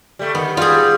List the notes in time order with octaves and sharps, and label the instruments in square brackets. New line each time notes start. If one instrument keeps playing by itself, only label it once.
[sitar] G3 A3
[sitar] D#3 [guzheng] B3
[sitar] G3 [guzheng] F4 G#4